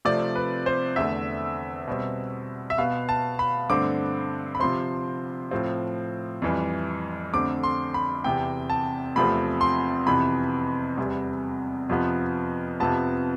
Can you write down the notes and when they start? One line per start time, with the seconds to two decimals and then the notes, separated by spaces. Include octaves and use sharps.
0.05 C3 F3 A3 C4 D5
0.35 B4
0.66 C5
0.96 E2 D3 A3 E5
1.87 B2 G3 C4
2.70 E5
2.78 B2 B3 F5
3.09 A5
3.39 B5
3.70 G2 D3 A3 C4 D6
4.55 B5
4.60 C3 F3 C4 C6
5.51 A2 F3 C4
6.42 F2 E3 G3
7.34 F2 D3 A3 C4 D6
7.63 C6
7.94 B5
8.24 E2 C3 E3 G5
8.70 A5
9.16 E2 C3 F3 A3 C4 B5
9.61 C6
10.07 F2 C3 E3 B3 B5
10.98 E2 C3 G3 B3
11.89 F2 C3 F3 B3
12.80 F2 C3 F3 B3 A5